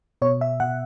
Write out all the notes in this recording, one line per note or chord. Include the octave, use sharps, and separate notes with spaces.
B2 C#5
E5
B2 F#5